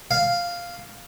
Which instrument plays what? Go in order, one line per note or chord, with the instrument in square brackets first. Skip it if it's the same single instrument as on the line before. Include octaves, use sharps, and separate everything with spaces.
[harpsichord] F5